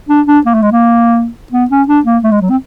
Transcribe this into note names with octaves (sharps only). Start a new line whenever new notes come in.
D4
D4
A#3
A3
G#3
A#3
B3
C#4
D4
A#3
A3
G#3
F#3
C4